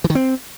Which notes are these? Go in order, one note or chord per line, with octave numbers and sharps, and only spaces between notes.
E3
D#3
C4